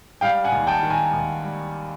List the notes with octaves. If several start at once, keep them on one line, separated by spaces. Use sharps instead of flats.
G3 F5 G5
F#5 G#5
D#2
G5 A5
D#3
G#5 A#5
D#2
G3